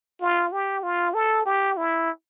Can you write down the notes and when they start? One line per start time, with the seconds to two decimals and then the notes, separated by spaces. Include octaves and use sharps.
0.21 F4
0.52 G4
0.83 F4
1.14 A4
1.46 G4
1.77 E4